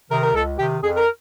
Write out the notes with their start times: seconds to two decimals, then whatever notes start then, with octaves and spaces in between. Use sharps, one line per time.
0.10 C3 D#3 A#4
0.23 A#4
0.34 C#2 A4
0.58 C3 D#3 G4
0.82 F2 G#4
0.96 A#4